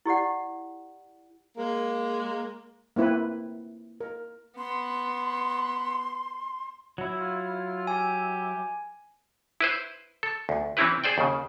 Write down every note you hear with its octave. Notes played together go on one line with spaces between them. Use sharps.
E4 G4 D5 F#5
G#3 A#3
A#3 C4 E4 B4
A#4
B3 C6
F#3 E4
F4
G4 G#5
E4 B4 C5
A4
D2
E3 C4 C#4 E4 G4 B4
G#4 C5 D5 G5
D#2 C#3